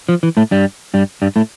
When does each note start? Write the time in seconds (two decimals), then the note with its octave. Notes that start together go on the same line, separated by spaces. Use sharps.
0.09 F3
0.23 E3
0.37 A2 A3
0.51 G2 G3
0.94 G2 G3
1.22 G2 G3
1.36 A2 A3